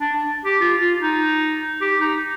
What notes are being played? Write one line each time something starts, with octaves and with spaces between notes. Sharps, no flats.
D4
G4
F4
F4
D#4
G4
D#4